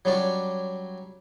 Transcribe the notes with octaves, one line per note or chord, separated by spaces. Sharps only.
F#3 G3 C#4 D4 D5